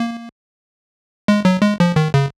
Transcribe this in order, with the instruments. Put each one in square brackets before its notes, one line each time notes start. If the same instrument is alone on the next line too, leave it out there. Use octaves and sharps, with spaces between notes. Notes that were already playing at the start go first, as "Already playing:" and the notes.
Already playing: [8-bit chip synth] A#3
G#3
F#3
G#3
F3
D#3
C#3